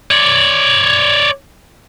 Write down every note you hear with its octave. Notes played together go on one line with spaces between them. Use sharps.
C#5 D5